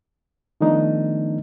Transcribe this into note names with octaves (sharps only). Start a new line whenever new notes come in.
D#3 F3 A3 B3 D4 D#4